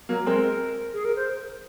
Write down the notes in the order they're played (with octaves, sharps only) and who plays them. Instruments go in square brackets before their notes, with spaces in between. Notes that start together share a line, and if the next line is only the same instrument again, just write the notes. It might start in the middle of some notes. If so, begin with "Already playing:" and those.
[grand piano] F#3 A#3
[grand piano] G#3 C4 [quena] A#4
[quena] G#4
A#4
C5